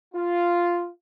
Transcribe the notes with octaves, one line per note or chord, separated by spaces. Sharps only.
F4